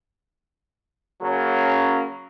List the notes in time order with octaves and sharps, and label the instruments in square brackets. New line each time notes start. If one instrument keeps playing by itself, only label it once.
[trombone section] C#3 F#3 A#3 C#4